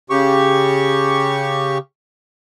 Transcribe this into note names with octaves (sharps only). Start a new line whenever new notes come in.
C#3 G4 C#6